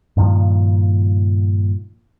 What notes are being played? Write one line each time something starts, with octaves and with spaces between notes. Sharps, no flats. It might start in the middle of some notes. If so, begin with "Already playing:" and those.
G2 A#2 D#3 F3